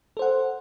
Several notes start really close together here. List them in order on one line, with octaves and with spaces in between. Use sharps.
A4 C5 F#5